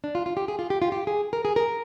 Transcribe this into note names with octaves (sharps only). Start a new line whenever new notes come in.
D4
F4
F4
G4
G#4
F4
G4
F4
G4
G#4
A#4
G#4
A#4